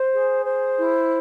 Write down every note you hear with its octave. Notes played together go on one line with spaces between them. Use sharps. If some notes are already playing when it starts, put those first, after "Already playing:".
Already playing: C5
G#4
C5
E4